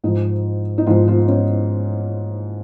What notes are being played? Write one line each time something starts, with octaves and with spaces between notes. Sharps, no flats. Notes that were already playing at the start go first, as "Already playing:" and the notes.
G#2 F3 D#4
D#4
G#2 F3 F4
F4
C#4